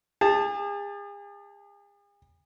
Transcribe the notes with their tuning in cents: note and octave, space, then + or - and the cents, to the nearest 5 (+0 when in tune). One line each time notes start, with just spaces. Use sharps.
G#4 -40 A5 +0